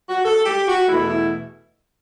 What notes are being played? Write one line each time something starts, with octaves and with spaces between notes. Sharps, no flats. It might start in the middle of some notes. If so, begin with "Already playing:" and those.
F#4
A4
G4
F#4
E2 B2 A3 E4
E4